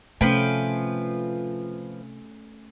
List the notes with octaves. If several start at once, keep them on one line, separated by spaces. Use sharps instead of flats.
C3 F3 A3 C#4 B4 G5